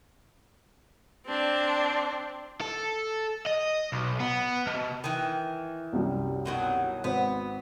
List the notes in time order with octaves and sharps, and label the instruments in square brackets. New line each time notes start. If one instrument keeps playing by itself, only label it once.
[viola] C4 D4
[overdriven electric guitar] A4
D#5
B1
B3
B2
[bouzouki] D#3 E3
[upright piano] C2 F#2 G3
[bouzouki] B2 D#3 F#3
[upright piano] G#1 C5 [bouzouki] B3